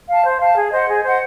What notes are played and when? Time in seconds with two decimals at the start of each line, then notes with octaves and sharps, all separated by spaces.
0.09 F5 A5
0.25 C5
0.41 F5 A5
0.56 G#4
0.72 C5 D#5 F#5
0.88 G#4
1.03 C5 D#5 F#5